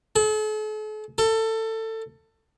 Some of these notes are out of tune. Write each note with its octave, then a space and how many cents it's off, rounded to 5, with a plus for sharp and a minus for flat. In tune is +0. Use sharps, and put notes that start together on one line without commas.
A4 -45
A4 +20